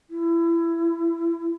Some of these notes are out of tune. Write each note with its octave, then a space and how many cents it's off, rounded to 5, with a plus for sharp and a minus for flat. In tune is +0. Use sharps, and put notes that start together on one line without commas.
E4 +25